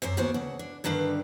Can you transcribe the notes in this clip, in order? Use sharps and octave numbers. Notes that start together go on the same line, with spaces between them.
F#2 C3 C5 E5
D#2 A#3 B3 F#4 C5
D2 C#3 F#5
D4
G2 D3 D#3 D4 B4 F5